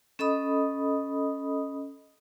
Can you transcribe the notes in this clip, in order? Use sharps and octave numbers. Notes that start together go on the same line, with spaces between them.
C#4 A4 D#5 B5 D#6